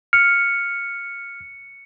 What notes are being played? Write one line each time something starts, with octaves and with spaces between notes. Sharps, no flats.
F6 C#7